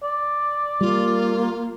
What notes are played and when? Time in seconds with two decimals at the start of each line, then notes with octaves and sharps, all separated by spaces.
0.03 D5
0.81 G3 A#3 F4